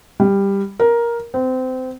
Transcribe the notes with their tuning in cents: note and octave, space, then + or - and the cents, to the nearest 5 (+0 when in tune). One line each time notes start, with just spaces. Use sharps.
G3 +10
A#4 +10
C4 -25